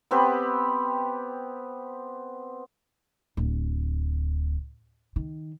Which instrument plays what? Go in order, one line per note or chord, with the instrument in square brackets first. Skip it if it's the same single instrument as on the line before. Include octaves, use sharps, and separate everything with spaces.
[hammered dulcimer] B3 C4 G4 B4
[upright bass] D1
D#3